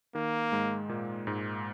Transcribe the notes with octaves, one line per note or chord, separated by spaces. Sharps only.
D#3 A#3
G#2 G#3
A#2 A#3
G#2 G#3